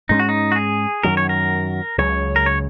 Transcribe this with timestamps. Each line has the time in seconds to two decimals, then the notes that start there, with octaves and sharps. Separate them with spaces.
0.09 G#2 G#3 C#4 D#4
0.20 F#4
0.29 D#4
0.52 F#4
0.56 G#4
1.03 F#2 D#3 F#3 A#4
1.17 C#5
1.29 A#4
1.98 C#2 C#3 F#3 C#5
2.36 A#4
2.46 C#5